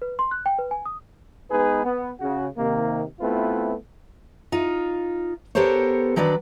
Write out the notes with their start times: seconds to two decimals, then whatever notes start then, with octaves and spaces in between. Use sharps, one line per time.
0.02 B4
0.19 C6
0.31 F#6
0.46 G5
0.58 B4
0.71 G#5
0.86 D#6
1.51 G#3 B3 D#4 G#4 B4
1.84 B3
2.20 C#3 F#4
2.57 C3 D#3 A#3
3.20 A3 B3 C4 E4 F4 B4
4.52 D#4 F4
5.55 B3 G4 A4 A#4 C5 C#5
6.16 D#3 F#3 D4 B4 D5